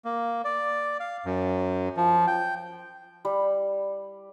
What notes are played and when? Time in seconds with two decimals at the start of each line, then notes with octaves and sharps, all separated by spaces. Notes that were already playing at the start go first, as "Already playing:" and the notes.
0.05 A#3
0.44 D5
1.00 F5
1.25 F#2
1.97 F3
2.27 G5
3.25 G3